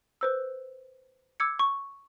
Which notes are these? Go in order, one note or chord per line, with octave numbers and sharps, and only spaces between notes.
B4 C5 E6
D6 E6 G#6 C#7
C#6